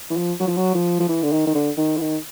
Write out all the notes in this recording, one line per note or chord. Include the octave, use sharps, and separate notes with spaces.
E3
F3
F#3
F3
F#3
F3
F3
E3
D3
D#3
D#3
D3
D#3
E3
D#3